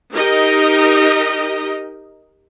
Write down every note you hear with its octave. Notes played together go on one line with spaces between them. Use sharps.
D#4 G4 A#4 D#5